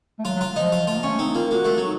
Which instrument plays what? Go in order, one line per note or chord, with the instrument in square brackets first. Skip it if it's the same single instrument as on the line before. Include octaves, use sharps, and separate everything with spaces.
[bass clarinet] A3
[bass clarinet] F#3 [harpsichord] F4
[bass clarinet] F#3
[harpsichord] F4
[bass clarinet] F3 [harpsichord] D#4
[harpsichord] F4
[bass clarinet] A3 [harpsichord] F4
[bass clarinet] A#3
[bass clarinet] A3 [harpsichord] C#4
[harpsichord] C4 [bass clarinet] D#4
[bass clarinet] D#4
[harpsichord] A#3 [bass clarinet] F4
[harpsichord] A#3 [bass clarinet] F#4
[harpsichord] A3
[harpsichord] F#3 [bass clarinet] D#4